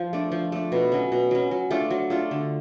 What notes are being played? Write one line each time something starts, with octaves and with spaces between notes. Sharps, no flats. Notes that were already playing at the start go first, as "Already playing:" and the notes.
Already playing: F3
A3 D4
F3
A3 D4
B2
F#3 C#4
B2
F#3 C#4
F#3
A3 D4 F4
F#3
A3 D4 F4
D3